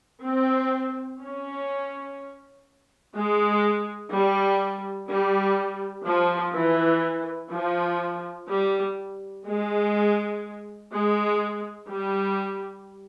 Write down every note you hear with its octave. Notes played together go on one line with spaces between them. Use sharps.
C4
C#4
G#3
G3
G3
F3
E3
F3
G3
G#3
G#3
G3